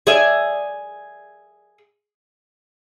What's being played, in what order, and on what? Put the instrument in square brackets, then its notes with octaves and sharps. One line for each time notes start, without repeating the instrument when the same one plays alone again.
[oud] G#4 D5 E5